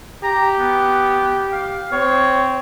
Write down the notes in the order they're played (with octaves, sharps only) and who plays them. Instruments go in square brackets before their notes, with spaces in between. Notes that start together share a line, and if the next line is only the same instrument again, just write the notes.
[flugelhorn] G4 [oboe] A#5
[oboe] B3
F5
[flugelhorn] C4 [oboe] C#5